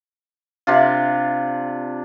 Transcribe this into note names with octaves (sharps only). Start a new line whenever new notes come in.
C3 D4 F4